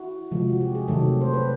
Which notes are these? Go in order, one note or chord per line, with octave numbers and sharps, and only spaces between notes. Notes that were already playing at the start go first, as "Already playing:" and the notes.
Already playing: E4 F#4
C3 F3 G#3
F#4
G4
G#4
C3 D#3 F#3 A3 G4 A4
C5
B4